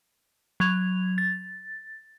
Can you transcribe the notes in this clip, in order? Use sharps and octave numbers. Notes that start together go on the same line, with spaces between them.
F#3 G#6 F7
A6